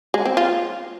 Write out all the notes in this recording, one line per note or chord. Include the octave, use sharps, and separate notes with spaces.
G#3
C4
F4